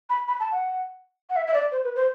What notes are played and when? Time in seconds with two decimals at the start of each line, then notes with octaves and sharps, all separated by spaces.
0.10 B5
0.28 B5
0.40 A5
0.52 F#5
1.30 F#5
1.36 E5
1.47 E5
1.54 D5
1.72 C5
1.84 B4
1.96 C5